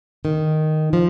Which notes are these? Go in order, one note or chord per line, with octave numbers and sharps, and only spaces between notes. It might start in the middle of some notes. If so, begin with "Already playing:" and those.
D#3
F3